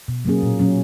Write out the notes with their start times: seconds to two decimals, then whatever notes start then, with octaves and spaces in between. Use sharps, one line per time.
0.08 B2
0.25 F#3 A#3 C#4 G#4
0.43 A#2
0.59 F#3 C#4